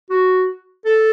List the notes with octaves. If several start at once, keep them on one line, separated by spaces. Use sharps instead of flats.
F#4
A4